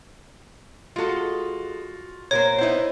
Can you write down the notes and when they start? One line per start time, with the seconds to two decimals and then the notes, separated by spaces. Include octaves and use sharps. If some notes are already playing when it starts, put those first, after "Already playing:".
0.96 G#3 F4 F#4 A4
2.31 A#2 A#4 C5 C#5
2.58 B3 D#4 E4 C5